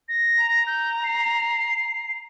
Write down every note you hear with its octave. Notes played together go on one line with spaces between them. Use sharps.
A#6
A#5
G6
C7